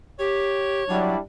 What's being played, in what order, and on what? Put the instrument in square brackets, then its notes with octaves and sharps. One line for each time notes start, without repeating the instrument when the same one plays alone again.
[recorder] G4 [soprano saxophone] C#5
[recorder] F#3 [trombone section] G3 D4 E4